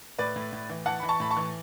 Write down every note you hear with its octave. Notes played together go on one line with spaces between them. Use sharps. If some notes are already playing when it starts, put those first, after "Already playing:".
A2 B4 D5
A2
A2
E3
E3 F#5 A5
E3 B5
A5 C#6
A2 B5
A5 C#6
E3